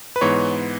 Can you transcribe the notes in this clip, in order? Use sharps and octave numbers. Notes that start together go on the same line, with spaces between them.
B4
G#2 E3 B3 C#5